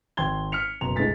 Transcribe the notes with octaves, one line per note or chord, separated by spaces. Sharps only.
G#1 G5 C6 G#6 G7
F6 B6 C#7 F7
F#1 B2 A#5 C6 F7
C#2 G#2 G#3 A3 A6 B6